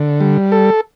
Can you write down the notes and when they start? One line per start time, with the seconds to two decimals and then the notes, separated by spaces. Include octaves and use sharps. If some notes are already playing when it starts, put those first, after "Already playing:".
Already playing: D3
0.21 G3
0.52 A4